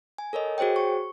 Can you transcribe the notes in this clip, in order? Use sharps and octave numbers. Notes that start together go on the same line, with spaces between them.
G#5
A4 A#4 C#5 D#5
F#4 G#4 C5 C#5 G5
C#6